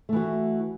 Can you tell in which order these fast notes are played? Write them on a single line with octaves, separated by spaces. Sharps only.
A3 E3 F#4